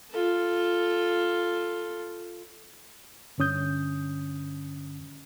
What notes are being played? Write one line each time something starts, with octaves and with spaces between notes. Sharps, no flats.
F4 A4
G2 D3 C#4 D#6 G6